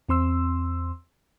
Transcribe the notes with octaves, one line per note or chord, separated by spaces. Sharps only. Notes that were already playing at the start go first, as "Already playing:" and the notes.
E2 C4 C6 E6